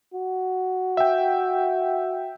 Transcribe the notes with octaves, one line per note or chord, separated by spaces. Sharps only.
F#4
E5 G5